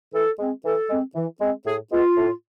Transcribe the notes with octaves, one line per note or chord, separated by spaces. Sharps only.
E3 A4
G#3 C4
E3 A4
G#3 C4
E3
G#3 C4
A2 G#4
G#3 B3 F4
A2